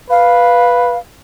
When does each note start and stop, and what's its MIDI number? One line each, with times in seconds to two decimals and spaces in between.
0.10 0.97 71
0.10 0.98 77